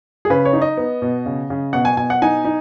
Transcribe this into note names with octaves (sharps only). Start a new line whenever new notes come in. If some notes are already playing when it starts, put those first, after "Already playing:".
G#4
C#3 B4
C#5
D#4
D#5
B3
B2
C#3
C#3
B2 F#5
G#5
B2 G#5
F#5
D#4 G#5
D#4